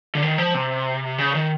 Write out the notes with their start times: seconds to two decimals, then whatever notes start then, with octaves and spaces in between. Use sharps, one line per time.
0.15 D3
0.22 D#3
0.38 F3
0.54 C3
1.18 C#3
1.35 D#3